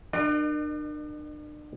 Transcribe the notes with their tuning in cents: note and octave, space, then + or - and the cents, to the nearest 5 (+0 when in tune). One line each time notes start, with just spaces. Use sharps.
D4 +40 A#4 +0 D#5 -40